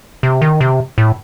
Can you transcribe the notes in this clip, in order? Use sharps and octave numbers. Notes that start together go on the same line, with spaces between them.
C3
D#3
C3
A2